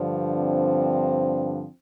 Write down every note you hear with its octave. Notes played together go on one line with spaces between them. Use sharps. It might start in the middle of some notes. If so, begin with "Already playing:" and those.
Already playing: G2 D3 F3
C4